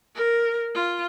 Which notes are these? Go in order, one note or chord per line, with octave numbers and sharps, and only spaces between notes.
A#4
F4